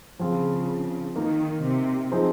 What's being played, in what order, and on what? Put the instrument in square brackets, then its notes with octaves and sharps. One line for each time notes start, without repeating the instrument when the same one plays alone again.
[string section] C#3 [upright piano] F3 C4 F4 G#4
[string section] D#3 [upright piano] A#3 D#4 A#4
[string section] C3
[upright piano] F3 C4 D#4 G#4 C5